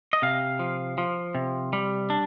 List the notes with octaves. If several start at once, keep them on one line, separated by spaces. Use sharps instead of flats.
D#5
C3 F5
F3
F3
C3
G3
D4